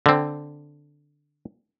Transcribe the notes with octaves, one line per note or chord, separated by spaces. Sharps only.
D3 C4